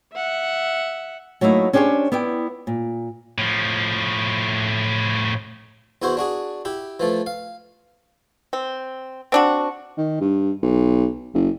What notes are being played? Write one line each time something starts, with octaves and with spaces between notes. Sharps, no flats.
E5 F#5
F#3 A3 A#3 D#4 E4
C#4 D4 G4 G#4 C5 C#5
B3 E4 D5 G5
A#2
A2 F3
E2 E4 F#4 C5
D4 F#4 G#4
E4 G4
E3 F3 A3
F5
C4
C4 D4 F#4
D#3
G2
B1
F#1